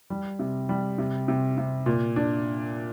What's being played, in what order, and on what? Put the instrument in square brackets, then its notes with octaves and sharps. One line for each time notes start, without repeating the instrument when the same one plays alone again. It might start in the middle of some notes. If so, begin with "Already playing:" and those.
[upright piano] G3
C3
G3
C3
C3
C3
A#2
D4